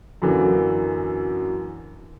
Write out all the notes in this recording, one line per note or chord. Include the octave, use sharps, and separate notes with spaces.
F#2 D3 E3 A#3